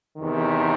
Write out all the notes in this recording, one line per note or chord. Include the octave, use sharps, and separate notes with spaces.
E2 C3 D#3